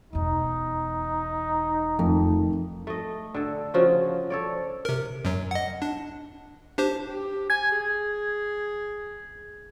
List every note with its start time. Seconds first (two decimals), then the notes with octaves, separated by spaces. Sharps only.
0.13 E1 E2 D#4
1.99 F2 D#3 A3
2.87 A3 D#5
3.34 D3 A4
3.74 C#3 F3 F#4
4.30 A4 C#5 D5
4.85 C3 A#4
5.25 F#2 F#3
5.51 D#5 F#5
5.82 D4
6.78 D4 G4 C5
7.08 G4
7.50 G#5 G#6
7.72 G#4